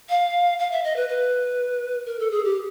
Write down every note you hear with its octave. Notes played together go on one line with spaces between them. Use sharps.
F5
F5
E5
D#5
B4
B4
A#4
A4
G#4
G4